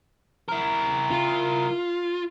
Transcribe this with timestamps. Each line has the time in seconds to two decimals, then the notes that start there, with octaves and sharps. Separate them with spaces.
0.49 E4 A#4
1.11 F4